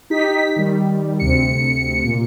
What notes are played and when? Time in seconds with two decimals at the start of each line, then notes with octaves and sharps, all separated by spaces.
0.10 D#4 G4 B6
0.56 D#3 G3
1.19 D2 C3 C#7
2.03 A#2